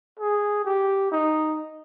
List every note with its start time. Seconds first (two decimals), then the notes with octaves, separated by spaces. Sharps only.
0.19 G#4
0.65 G4
1.12 D#4